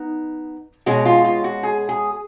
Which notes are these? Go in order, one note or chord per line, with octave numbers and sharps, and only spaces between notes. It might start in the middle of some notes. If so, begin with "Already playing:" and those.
Already playing: B3 D#4
B2 G#3 C#4 F#4
F4
F4
F#4
G#4
G#4